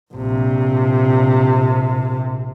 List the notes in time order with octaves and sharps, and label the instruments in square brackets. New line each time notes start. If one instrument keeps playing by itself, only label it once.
[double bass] A#1 C3